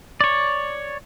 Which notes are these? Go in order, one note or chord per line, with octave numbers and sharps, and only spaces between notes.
C#5 D5